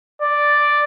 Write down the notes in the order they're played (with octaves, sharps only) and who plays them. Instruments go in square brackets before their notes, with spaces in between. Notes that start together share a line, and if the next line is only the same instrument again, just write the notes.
[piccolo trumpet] D5